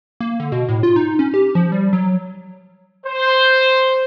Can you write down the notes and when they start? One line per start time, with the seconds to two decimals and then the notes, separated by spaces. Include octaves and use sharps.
0.21 A#3
0.40 D3
0.52 B2
0.69 A2
0.83 F4
0.96 D#4
1.19 C#4
1.34 G4
1.55 F3
1.72 G3
1.93 F#3
3.05 C5